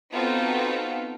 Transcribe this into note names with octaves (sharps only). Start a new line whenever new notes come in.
B3 C4 D#4 F4 F#4 A4